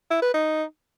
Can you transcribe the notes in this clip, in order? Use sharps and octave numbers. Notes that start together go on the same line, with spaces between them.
E4
B4
D#4